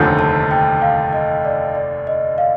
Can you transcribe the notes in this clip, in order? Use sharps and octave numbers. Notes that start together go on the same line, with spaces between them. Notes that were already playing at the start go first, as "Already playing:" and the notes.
Already playing: F1 D#2 D3 F3 G6
A5
G5
F5
D#5
D5
D5
D#5
F5